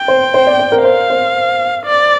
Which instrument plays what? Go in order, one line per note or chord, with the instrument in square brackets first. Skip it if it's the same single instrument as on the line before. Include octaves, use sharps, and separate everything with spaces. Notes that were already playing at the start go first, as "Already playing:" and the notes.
Already playing: [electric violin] G5
[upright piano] C5
C5
D5
C5
A#4
[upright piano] C5 [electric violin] F5
[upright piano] C5
[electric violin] D5